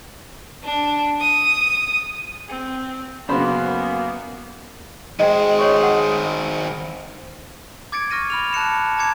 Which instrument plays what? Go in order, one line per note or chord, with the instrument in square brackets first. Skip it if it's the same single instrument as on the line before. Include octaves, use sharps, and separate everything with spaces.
[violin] D4
D#6
[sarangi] C4
[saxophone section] F#2 A#3 [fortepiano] C#3 C5 B5 [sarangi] B3
[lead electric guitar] D#3 C5 [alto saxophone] G#3 [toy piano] D#5 G5
[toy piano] C#5 C#6
F#5
[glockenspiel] D6 G#6 A6 C#7 D7
C#6 F6 A#6 D#7
B5 F6 F7
A5 F#6 C#7 E7
C#7
A5 A#5 D6 G#6 C#7